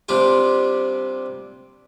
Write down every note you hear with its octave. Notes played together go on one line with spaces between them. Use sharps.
C3 G3 D4 F4 G4